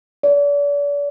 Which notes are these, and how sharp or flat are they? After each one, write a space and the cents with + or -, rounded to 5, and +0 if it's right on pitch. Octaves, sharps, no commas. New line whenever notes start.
D5 -40